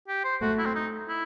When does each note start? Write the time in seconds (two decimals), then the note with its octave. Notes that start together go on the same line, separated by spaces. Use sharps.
0.08 G4
0.24 C5
0.41 A3 F#4
0.58 E4
0.66 C4
0.75 D#4
1.09 E4